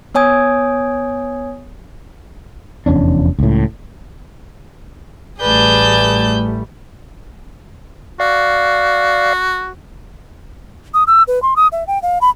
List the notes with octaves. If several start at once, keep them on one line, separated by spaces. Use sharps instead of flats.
B3 C#5 G#5 D#6 G#6
F1 E2 C#4 D4
C#2 A2
A1 G3 A3 G#4 B4 D5 A5 G6
F#4 D5 F5
D#6
E6
B4
C6
D#6
E5
G5
F5
B5